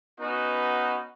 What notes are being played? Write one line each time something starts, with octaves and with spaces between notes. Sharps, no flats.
B3 C#4 D#4 F#4 B4